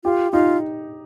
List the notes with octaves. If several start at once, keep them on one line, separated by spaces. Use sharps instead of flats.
F4 G4
D#4 F4